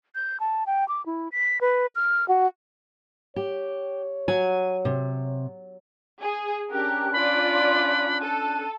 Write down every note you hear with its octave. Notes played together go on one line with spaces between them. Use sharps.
G6
A5
G5
D6
E4
B6
B4
F6
F#4
G4 C#5
F#3 G#5
C3
G#4
C#4 D4 G4 A#4 F#6
F4 D5 B5
A4 D#7